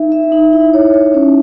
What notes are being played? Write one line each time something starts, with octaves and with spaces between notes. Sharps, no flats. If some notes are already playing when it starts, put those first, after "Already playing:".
Already playing: D#4 E5
E5
D#4
E4
C#5
C#5
C#4